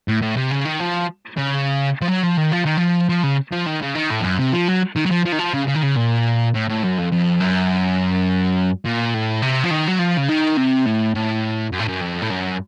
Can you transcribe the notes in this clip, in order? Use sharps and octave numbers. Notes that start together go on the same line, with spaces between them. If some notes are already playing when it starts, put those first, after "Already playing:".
A2
A2
C3
C#3
D#3
F3
C#3
F3
F#3
F3
D#3
F3
D#3
F3
F3
C#3
F3
D#3
C#3
D#3
A2
F2
F#2
C3
F3
F#3
D#3
F#3
F3
F3
D#3
F3
C#3
C#3
D#3
C#3
A#2
A2
A2
F#2
F2
F2
F#2
A#2
A2
C3
F3
D#3
F#3
F3
C#3
D#3
C3
A2
A2
F#2
A2
F#2
F2
A2
F#2